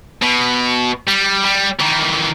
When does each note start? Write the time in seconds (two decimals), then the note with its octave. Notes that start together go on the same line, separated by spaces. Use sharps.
0.22 B2
1.07 G3
1.45 G3
1.79 D#3 E3